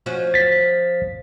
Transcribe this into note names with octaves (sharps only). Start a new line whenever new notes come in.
F3 C#4 F#4
A6 B6